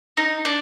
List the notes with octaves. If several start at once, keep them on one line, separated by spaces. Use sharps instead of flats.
D#4
D4